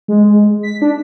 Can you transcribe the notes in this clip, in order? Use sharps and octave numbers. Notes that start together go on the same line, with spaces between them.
G#3
B6
D4